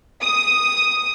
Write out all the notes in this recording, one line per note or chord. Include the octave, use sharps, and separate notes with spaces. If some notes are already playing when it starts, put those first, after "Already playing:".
D#6